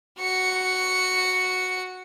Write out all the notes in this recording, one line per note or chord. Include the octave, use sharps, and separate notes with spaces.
F#4 C#7